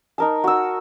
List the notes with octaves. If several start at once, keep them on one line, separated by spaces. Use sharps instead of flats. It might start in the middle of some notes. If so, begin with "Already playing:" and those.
D#4 A#4 A5
F#4 E6